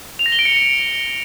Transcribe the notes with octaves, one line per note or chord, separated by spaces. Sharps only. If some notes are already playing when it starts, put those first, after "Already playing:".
F7
A#6
G7
D7
C#7